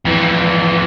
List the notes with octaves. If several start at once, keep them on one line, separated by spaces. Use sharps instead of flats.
F2 E3